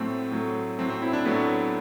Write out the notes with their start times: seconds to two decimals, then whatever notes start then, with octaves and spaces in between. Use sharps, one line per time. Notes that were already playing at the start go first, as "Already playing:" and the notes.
Already playing: A2 F#3 A3 C4
0.31 A2 F#3 A3
0.78 A2 F#3 A3 C4
0.90 C4
1.02 E4
1.13 D4
1.25 A2 F#3 A3 B3